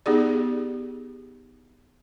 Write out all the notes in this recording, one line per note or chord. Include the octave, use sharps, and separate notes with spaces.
B3 D#4 G4 G#4 D5